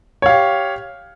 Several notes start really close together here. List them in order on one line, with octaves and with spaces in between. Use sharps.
C#5 F5 G4